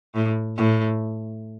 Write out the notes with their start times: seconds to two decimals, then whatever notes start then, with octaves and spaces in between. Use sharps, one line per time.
0.15 A2
0.57 A2